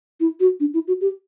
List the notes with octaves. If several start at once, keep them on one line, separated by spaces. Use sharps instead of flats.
E4
F#4
D4
E4
F#4
G4